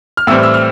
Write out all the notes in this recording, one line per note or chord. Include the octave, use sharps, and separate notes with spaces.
F6
A2 E3 G3 C4 E6
E6
F6